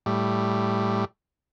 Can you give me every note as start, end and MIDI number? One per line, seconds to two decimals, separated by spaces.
0.06 1.05 45
0.06 1.05 55